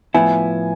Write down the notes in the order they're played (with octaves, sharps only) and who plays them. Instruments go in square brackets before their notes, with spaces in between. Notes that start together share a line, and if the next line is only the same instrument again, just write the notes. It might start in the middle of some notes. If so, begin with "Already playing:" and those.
[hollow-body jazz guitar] A2 F3 B3 E4 [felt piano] G#5